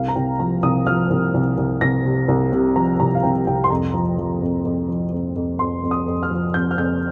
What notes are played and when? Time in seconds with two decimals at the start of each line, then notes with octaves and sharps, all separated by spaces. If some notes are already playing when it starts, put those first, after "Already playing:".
Already playing: C2 F5
0.08 A#5
0.16 C2 G5
0.39 F3 A#5
0.63 C2 D#6
0.87 F3 F6
1.10 C2
1.34 C2
1.57 C2
1.81 C2 A#6
2.05 C3
2.28 C2
2.52 C3
2.76 F3 A#5
2.99 C2 A#5
3.15 F5
3.23 C2 G5
3.47 C2 G5
3.64 C6
3.70 F2 A#5
3.94 F3
4.18 F3
4.42 F2
4.65 F2
4.88 F3
5.12 F2
5.36 F2
5.59 F2 C6
5.83 F2
5.91 D#6
6.06 F2
6.23 F6
6.30 F3
6.54 F2 G6
6.71 F6
6.77 F2 G6